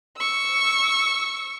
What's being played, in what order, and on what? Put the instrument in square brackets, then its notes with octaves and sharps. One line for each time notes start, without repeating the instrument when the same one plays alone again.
[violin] C#6 E6